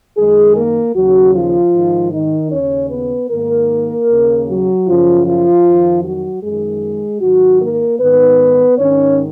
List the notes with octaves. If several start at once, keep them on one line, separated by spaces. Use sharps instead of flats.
F#2 D#3 G#3 G#4
A#3 A#4
D#2 C#3 F#3 F#4
F3 F4
G#2 D#3
D#3 D#4
D#2 C#3 C#4 C#5
B3 B4
G#2 D#3 A#3 A#4
D#2 C#3
F#3 F#4
F#2 C#3 F3 F4
F3 F4
F2 D#3
F#3 F#4
F#2 D#3 G#3 G#4
G#2 D#3 F#3 F#4
A#3 A#4
G#2 D#3 B3 B4
G#2 D#3 C#4 C#5